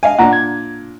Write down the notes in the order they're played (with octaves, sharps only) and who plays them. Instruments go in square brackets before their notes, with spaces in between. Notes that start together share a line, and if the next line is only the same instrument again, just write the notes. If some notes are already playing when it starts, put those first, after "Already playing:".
[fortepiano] D#5 F5 G#5
[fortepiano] A#2 D4 [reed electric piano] F#5 A#5
[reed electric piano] G#6